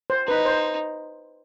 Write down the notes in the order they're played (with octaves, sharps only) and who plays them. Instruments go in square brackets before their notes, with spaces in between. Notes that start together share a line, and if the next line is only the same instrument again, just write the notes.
[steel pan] C5
[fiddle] D#4 [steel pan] B4
[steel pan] C5